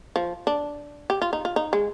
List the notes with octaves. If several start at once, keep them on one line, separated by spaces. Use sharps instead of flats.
F3
D4
G4
F4
D#4
F4
D#4
G#3